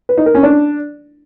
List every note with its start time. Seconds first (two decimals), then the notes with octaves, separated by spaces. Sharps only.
0.09 B4
0.18 D#4
0.26 A#4
0.35 C#4
0.43 D4